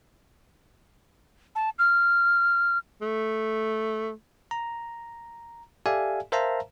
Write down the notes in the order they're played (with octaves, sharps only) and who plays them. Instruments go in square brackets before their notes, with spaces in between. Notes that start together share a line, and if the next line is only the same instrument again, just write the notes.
[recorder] A5
F6
[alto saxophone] A3
[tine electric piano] A#5
G4 A4 D5 E5 F5 G#5
A#4 C5 E5 F5 A5 A#5